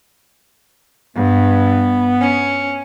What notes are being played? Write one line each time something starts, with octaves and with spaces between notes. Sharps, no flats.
G2 B3
C#4